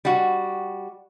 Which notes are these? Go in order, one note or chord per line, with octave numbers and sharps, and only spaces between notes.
G3 F#4